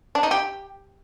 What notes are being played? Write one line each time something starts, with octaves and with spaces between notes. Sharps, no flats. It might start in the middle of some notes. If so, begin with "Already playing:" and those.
D4
D#4
G4